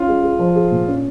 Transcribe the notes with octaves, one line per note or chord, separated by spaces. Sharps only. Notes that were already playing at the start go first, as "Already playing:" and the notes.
Already playing: C#4 F4
G#3
G#4
F3
G#4
A#2
C#4